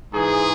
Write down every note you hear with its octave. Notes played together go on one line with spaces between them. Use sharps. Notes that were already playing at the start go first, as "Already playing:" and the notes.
G#2 E3 G#4